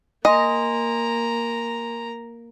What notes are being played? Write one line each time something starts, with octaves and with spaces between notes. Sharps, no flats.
A#3 D#5 G#5 A#5 C6